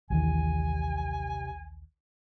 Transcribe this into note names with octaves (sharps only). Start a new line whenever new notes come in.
A#1 D#2 C3 E3 G#5